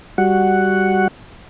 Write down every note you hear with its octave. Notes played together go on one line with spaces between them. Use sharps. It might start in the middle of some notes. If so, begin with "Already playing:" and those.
G3 F#4 F#5